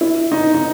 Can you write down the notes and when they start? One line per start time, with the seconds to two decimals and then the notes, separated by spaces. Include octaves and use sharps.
0.01 E4
0.32 D#4
0.54 D#4